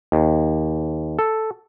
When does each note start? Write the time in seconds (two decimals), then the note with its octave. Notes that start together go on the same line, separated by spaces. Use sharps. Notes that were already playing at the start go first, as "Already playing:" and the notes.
0.12 D#2
1.19 A4